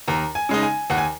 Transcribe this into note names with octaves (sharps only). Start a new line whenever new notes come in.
D#2 A#5
G#5
C#3 G#3 D#4
G#5
D#2 F#5
G#5